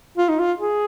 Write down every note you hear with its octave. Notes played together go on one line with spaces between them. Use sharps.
F4
D#4
F4
G#4